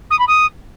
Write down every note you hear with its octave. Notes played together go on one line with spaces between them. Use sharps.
D#6
B5
D#6